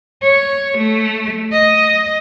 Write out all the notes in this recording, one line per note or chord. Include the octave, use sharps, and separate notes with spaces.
C#5
A3
D#5